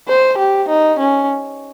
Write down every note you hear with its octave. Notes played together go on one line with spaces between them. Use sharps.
C5
G4
D#4
C#4